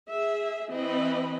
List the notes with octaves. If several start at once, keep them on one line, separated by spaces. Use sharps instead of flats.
G#4 E5
E3 C4 D#5 B5